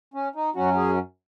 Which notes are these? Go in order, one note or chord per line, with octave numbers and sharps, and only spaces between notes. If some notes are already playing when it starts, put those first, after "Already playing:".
C#4
D#4
F#2 F#3 C#4 F#4
G#4